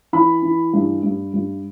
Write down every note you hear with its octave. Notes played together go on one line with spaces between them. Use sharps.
E3 B5
E3
G2
G2
G2